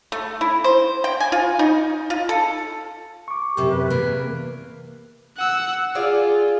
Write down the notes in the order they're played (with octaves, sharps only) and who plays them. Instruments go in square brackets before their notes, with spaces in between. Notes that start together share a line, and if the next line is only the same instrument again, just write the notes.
[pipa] A3
E4
C5
G5
G#5
F4
D#4
F4
A4
[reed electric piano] C#6 D6
[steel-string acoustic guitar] F#2 C3 [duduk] G4
[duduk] B4
[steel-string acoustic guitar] E2 E3 A#3 [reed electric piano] C3
[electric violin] F#5 E6
[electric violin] F4 [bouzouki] G#4 D5 F5